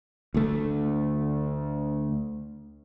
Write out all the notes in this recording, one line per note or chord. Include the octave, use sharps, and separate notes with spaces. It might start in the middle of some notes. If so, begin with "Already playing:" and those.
D2 A3